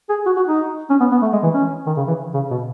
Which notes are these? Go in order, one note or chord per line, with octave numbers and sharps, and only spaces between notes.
G#4
F#4
F#4
D#4
C#4
B3
B3
A3
G#3
E3
C#4
D#3
C#3
E3
C#3
B2